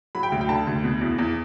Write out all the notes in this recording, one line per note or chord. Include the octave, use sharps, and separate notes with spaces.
F#3 B5
G5
D2
G5
D3 A5
D2
B2
E2
E2